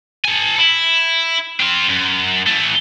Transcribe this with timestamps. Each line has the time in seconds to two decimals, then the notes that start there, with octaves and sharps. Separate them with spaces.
0.25 A4 G#5
0.58 E4
1.60 C4 F4
1.89 F#2
2.46 E3 A3